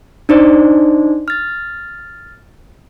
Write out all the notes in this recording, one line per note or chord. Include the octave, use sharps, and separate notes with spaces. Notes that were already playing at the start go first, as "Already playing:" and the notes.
D4 D#4 C5 D5
F6 A6